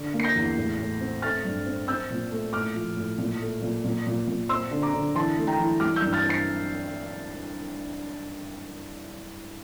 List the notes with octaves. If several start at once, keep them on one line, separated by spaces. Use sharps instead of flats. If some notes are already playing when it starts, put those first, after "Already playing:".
Already playing: D3
A#3
C7
G6 A#6
E2
A2
A2
C4
A3 F6 A6
G2
C4
C4 E6 G6
A#2
A3
A2 D6 F6
F3
A2
A#2
A3
A#2
A#2
A#2
A#2
C4 C6 E6
D3
A#5 D6
D3
E3 A5 C6
A3
G5 A#5
E3
G3 D6 F6
E6 G6
G2
F6 A6
C4
A6 C7